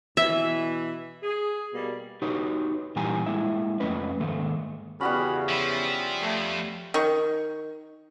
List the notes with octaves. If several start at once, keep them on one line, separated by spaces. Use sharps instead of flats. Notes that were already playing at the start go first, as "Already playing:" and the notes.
B2 E3 E5
G#4
B2 G3 A#3
D#4 F#4 G4 B4 C#5
A#2 E3 G3 G4 G#5 A#5
G#3 A#3 E4 E5
F2 A3 C#4 B4 D#5
G#2 D#3 A3 A#3
E2 C#3 E3 G3 B3 C#4 F#4 B5
F3 E5
F2 A3
D#3 C#6